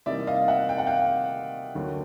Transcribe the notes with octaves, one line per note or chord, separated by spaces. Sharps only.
C3 E3 G3 A#3 D#4 D5 E5
D#5 F5
E5 F#5
G5
F#5
F5 G5
D2 D3 F#3 A#3